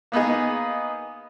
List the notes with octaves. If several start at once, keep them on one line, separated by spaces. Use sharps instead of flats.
A#3 B3 D#4 G#4